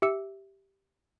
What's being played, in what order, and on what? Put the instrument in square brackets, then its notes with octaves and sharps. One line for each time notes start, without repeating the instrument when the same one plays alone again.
[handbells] G4 E5 E6 C#7